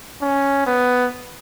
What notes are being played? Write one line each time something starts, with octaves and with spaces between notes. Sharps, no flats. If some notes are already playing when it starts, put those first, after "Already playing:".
C#4
B3